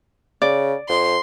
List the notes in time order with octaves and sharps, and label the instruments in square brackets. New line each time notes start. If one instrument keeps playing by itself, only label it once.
[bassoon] C#3 [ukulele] D5
[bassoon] F2 [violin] C6